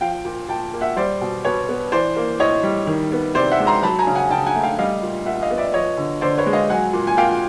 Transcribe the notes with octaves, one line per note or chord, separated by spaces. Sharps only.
F3 F5 G5
A#2
A#2 G5 A5
A#3
E5 F#5
G3 C5 D5
B2
B2 B4 C#5
B3
E3 C5 D5
A#3
A2 C#5 D#5
G3
D#3
B3
C3 C5 D5
E5 F#5
G#3
A#5 C6
F#3 A5 B5
G#5 A#5
C#3
F#5 G#5
C#3 G5 A5
F#5 G#5
A3
F5 G5
G3 D#5 F5
A#2
A#2 E5 F#5
D#5 F5
B3
D5 E5
F3 C#5 D#5
D3
D3 C5 D5
B4 C#5
G#3
D#5 F5
F#3 F#5 G#5
A#2
G#5
A#2 F5 G5